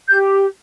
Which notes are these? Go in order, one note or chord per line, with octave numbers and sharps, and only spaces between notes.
G4 G6